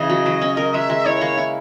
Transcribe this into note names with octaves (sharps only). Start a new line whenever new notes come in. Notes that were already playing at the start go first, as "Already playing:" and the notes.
Already playing: C#3 E3 D#5
F#3
F#3
C#4
A#4
G#3 E5
G#3
E4 C#5
A#3
E4